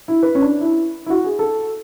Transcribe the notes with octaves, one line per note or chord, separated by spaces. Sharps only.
E4
B4
C#4
D4
E4
E4
F#4
G#4
A4